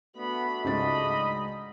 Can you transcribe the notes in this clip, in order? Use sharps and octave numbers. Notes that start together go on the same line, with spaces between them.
A3 B3 D4 F#4 B5
C#2 G#2 D#5 B5 A6